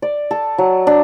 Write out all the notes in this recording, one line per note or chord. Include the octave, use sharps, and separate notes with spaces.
D5
A4
F#3
D4